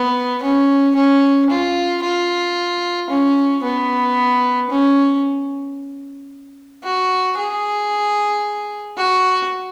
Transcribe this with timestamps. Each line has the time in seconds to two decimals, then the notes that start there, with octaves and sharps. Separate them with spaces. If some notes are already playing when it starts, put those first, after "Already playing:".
Already playing: B3
0.43 C#4
0.96 C#4
1.50 F4
2.03 F4
3.10 C#4
3.63 B3
4.70 C#4
6.84 F#4
7.38 G#4
8.97 F#4